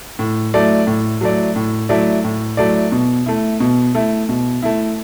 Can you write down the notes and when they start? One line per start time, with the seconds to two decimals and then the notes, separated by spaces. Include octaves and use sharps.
0.19 A2
0.54 F#3 A3 E4 D5
0.87 A2
1.21 F#3 A3 E4 D5
1.56 A2
1.89 F#3 A3 E4 D5
2.24 A2
2.57 F#3 A3 E4 D5
2.92 B2
3.26 A3 E4
3.60 B2
3.95 A3 E4
4.29 B2
4.63 A3 E4